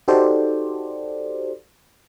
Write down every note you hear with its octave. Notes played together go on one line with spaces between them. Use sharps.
D#4 F#4 G4 A4 C5 D5